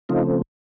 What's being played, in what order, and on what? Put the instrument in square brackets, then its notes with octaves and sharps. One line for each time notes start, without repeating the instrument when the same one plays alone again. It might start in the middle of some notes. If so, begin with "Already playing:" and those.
[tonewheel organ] C#3 F3 A3 C4 D#4 F4